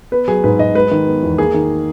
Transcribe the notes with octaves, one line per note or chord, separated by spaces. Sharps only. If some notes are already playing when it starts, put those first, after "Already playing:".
B3 B4
F#3 G#4
G#2 B4
G#2 D#5
G#3 B4
D#3
B3
E2
A#3 G#4
D#3